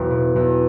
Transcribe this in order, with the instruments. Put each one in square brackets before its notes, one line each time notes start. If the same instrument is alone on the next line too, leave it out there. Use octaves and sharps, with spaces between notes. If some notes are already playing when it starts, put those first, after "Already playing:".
Already playing: [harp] E1 E2 G4
B2
E2